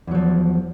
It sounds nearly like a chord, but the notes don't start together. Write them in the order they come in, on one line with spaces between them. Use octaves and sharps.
E2 F#3 F3